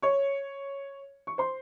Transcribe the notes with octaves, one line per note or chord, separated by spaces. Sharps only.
C#5 C#6
C#6
C5 C6